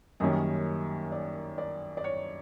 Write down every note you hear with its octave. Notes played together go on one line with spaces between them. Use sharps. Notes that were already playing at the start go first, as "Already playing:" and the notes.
F#2 D#3 G3 A#3 C#4 D#5
D5
D5
D5
C#5